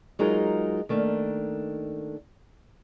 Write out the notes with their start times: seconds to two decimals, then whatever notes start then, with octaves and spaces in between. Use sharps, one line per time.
0.19 F#3 G#3 D#4 F4 A#4
0.89 D#3 A3 A#3 D4